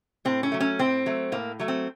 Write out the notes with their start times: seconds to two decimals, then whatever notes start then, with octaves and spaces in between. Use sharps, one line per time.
0.25 A2 C4
0.43 C#4
0.52 F#3 A3
0.60 C#4
0.79 A2 C4
1.06 F#3 A3
1.32 A2 A#3
1.59 F#3 A3
1.68 C4